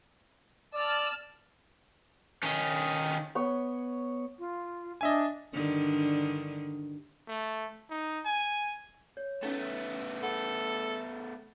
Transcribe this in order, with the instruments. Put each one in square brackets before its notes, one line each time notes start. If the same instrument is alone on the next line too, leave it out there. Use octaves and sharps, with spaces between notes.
[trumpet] D5 [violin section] A5 E6 F6
[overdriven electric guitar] D#3 C#4
[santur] B3 C#5
[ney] F4
[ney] D4 [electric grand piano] D#5 E5 G#5
[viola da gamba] G2 D3 D#3
[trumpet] A3
D#4
G#5
[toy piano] C#5
[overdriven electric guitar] A3 B3 [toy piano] C#4 D#4 E4
[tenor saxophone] A4 [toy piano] F#5 B5